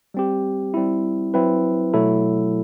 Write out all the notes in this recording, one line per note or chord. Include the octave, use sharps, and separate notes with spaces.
G3 C4 G4
G3 C4 E4
F#3 C4 E4 B4
B2 F#3 A3 E4 A4